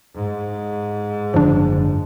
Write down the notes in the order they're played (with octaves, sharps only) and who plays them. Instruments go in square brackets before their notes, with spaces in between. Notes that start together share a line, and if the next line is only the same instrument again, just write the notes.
[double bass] G#2
[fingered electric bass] F#1 D3 [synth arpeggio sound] F3 D4